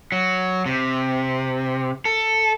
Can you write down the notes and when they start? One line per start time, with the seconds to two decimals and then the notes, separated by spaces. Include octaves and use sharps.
0.12 F#3
0.66 C3
2.05 A4